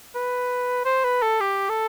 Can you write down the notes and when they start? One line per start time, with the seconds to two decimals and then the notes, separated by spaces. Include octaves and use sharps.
0.15 B4
0.85 C5
1.04 B4
1.22 A4
1.41 G4
1.69 A4